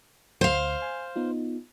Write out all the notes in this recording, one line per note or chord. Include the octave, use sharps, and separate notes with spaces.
D2 C5 F5
G#5
B3 D#4 F4